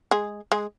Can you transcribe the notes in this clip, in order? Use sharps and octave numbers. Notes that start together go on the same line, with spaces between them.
G#3 G#4
G#3 G#4